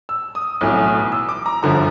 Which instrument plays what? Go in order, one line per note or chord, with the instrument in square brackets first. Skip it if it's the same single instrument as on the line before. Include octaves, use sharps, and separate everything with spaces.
[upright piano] E6
D#6
B1 A2 E3
E6
D6
A#5
G1 F#2 D3 F3 A#5